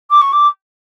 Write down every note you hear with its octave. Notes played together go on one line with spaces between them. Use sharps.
D6
C#6
D6